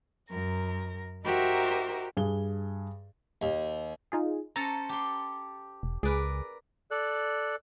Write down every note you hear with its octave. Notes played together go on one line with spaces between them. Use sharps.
F#2 A#4 A#6
D#4 F#4 G4 A#4 C5 E5
G2 G#4 G7
D#2
D#4 F4 G#4
C#4 A4 C5 A#5 A6 C#7
G4 C6
E1
C#2 G#4 A#4 B4 D5
A4 D5 F#6